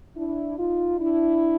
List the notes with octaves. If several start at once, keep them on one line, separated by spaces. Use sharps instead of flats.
D4 E4
D#4 F4
D4 E4